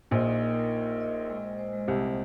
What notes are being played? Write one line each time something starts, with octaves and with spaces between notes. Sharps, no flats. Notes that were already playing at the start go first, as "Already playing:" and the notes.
A#1 A#2 D#5
D#4
A#4
A#4
A#4
D#4
D#5
D#5
G#3
C5
C5
G#3
C2 C3 C5
G#3